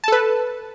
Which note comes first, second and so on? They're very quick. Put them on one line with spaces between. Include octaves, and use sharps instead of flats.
A5 A4 B4